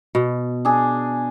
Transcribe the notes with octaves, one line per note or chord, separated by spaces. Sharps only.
B2
D4 G#4